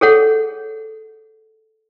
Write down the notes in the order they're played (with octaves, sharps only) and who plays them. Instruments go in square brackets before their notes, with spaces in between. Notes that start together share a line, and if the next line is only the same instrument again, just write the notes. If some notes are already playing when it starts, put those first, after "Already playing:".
[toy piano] G#4 A4 C#5 F#5